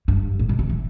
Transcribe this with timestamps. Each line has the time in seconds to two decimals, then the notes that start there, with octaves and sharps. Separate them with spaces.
0.08 G2
0.39 A#2
0.49 B2
0.59 C3
0.70 E3